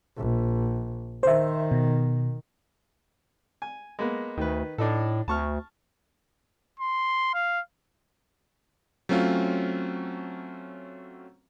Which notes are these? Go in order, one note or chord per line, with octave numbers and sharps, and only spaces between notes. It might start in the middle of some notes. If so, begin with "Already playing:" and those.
A#1
D#3 C5 E5
B2
G#5
G#3 A#3 B3
D2 D#3 B4
A2 D4 D#4 A4
D2 A5 C#6 F6
C6
F5
F#3 A3 C4 C#4 F4